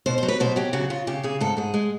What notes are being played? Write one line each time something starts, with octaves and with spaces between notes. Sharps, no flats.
B2 C5
C5
F#3
B4
B2 C5
F#3 G4
C#3 F#4
C#3 F4
C#3 G4
C#3 G#4
G#2 A4
G#2 G#4
G#3